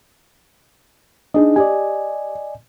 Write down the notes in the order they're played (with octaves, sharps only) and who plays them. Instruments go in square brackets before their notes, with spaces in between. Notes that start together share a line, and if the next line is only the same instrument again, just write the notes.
[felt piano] D4 [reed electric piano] D#4 G#4 D#5
[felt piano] G4 [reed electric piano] D5 D#5 G#5